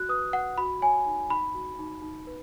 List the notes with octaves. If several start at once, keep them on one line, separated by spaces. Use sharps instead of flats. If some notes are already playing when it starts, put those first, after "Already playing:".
Already playing: F#4 F#6
B4 D#6
B4 F#5
F#4 B5
C#5 G#5
D#4
D#4 B5
F#4
D#4
D#4
B4